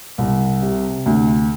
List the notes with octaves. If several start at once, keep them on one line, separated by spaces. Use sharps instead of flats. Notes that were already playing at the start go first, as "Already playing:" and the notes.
C2
C3
D2